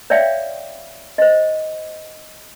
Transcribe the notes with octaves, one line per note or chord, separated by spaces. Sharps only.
C#5 D5 E5 F5 G5
C5 D#5